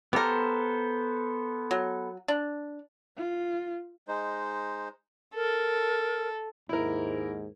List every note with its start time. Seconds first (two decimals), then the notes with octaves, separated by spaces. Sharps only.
0.13 B3 G4 A4 A#4 C5
1.71 F#3
2.28 D4
3.17 F4
4.08 G#3 D#4 C5
5.35 A4 A#4
6.69 D#2 G#2 E4 A#4